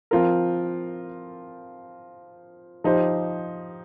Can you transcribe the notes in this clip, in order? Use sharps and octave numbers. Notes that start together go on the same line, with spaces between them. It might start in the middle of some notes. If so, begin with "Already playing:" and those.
F3 C4 F4 A#4
F3 D#4 G4 C5